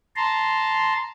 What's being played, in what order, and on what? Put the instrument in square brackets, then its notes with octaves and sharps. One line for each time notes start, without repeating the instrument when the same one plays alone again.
[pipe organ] A5 A#5 C6